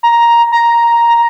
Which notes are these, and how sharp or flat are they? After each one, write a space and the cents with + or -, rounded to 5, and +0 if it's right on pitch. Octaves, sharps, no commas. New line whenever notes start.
A#5 +10
A#5 +5